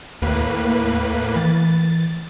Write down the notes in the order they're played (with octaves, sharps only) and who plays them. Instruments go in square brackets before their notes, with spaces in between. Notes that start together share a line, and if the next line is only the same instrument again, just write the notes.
[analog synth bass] D#2 [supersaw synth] A2 A#3 B4
[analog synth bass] E3 [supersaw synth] A6